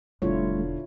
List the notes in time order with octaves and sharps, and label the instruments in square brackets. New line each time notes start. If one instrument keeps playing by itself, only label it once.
[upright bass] E1 D4 [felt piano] D3 [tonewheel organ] G3 A3 [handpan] E4 F4 C#5